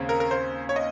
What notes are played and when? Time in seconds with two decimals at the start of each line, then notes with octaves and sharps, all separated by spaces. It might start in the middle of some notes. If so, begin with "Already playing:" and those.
Already playing: D#2 C#3 C4
0.09 A#4
0.20 A#4
0.31 C5
0.69 C#5
0.76 D#5